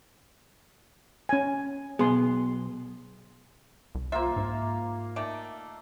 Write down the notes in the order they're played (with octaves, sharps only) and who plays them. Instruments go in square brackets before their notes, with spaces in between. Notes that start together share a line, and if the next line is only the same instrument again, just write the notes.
[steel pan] C#4 G#5
[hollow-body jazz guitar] B1 B3 [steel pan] G#4 C6
[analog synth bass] C2
[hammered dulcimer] A#3 F4 [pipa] C5 E5
[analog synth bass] G#2
[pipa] D#3 A3 D5